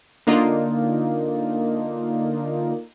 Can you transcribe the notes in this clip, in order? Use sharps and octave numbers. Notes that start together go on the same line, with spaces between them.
D3 A#3 D4 D#4 F4